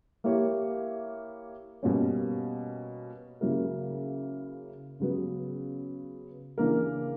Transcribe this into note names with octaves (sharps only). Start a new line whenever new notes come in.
A#3 E4 G4 A#4 C#5
B2 G3 A#3 C#4
C#3 F#3 A#3 E4 A#4
C#3 F#3 B3
C#3 E3 A#3 D4 A#4